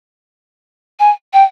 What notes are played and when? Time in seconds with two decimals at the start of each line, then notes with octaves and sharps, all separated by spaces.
1.00 G#5
1.33 G5